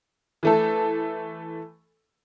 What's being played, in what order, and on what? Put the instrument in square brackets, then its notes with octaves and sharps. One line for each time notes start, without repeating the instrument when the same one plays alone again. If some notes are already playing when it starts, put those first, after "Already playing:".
[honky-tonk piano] E3 A3 A4